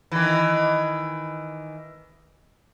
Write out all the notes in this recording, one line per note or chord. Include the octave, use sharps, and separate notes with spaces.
D#3 E3